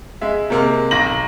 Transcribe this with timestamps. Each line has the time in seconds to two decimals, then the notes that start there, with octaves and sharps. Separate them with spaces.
0.21 G#3 E5
0.50 C3 G#3 A#3
0.91 B1 A#5 A#6 F#7